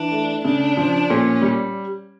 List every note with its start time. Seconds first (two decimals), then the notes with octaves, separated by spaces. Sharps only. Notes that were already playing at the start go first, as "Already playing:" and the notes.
Already playing: E3 D4
0.11 A3
0.44 C#3 D4
0.77 F3
1.10 A#2 C#4
1.42 G3